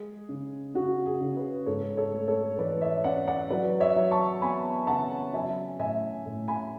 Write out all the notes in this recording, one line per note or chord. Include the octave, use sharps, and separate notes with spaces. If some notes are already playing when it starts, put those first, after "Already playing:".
Already playing: G#3 G#4
C#3
C#3 F#4
G#4
C#3
G#4 B4
G#2 A4 C#5
A4 C#5
A3
A4 C#5
E3 B4 D5
C#5 E5
C#4 D5 F#5
D5 F#5
F#3 B4 D5
C#5 E5
F#3
A5 C#6
B3 G#5 B5
C#3 F#5 A5
F#3 E5 G#5
A2 E5 G#5
A2
G#5 B5